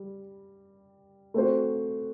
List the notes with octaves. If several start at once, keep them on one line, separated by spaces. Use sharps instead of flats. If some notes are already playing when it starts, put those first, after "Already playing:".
Already playing: G3
A3 C4 F#4 C5